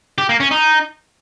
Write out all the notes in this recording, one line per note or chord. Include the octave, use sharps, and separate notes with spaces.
G4
A#3
C#4
D#4